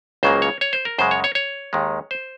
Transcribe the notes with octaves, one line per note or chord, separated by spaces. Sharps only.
C#2 C#3 F#3 A#3 C5
C#5
C#5
C5
A#4
F#2 C#3 G#3 C5
C#5
C#5
C#5
D#2 D#3 G#3
C5